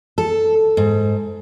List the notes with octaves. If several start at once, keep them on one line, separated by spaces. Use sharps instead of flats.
A4
G#2